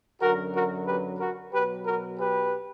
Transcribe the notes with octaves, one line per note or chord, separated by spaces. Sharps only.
F#2 D3 F#3 F#4 A#4
F#4 A#4
G4 B4
F#4 A#4
B2 F#3 G4 B4
F#4 A#4
G4 B4